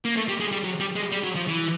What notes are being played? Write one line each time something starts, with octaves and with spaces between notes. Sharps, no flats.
A#3
A3
G3
G#3
G3
F#3
G3
G#3
G3
F#3
F3
E3